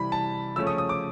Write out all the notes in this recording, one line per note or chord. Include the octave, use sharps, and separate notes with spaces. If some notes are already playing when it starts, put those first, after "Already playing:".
Already playing: C3 E3 G3 B5
A5
C#3 F3 A3 C#4 E6
D#6
D#6
D6